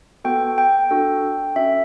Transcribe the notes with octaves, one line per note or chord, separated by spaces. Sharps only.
B3 F#4 A4 G5
G5
D4 F#4 A4
C#4 F#4 A4 E5